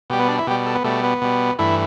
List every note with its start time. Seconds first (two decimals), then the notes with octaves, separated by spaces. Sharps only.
0.10 B2 G3 G4
0.19 B3
0.28 D4
0.38 E4
0.47 B2 G4
0.51 G3
0.66 A4
0.75 B3
0.84 B2 G3 A3
1.03 B3
1.22 B2 G3
1.59 G2 E3 A3 E4